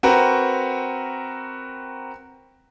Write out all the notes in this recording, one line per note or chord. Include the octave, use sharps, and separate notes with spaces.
C4 F#4 A#4 B4